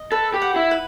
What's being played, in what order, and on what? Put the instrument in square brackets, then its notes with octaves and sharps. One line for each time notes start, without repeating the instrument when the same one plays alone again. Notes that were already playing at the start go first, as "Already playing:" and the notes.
Already playing: [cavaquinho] D#5
[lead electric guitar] A4 [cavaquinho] B4
[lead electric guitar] G4
[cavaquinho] F#5
[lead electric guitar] E4
[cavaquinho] B4